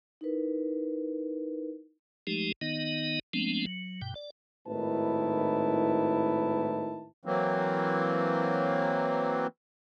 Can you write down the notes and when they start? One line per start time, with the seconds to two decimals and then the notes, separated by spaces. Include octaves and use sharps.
0.21 D#4 E4 A#4 B4
2.27 F3 G#3 A3 D#4 G4
2.61 D#3 B3 D#4 D#5
3.33 F3 G#3 A3 B3 C4 D4
3.66 F#3
4.02 G2 B2 G5
4.15 D5
4.67 G#1 A2 D#3 E4 B4 A5
7.25 E3 F#3 A#3 C4